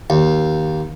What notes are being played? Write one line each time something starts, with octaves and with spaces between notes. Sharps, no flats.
D#2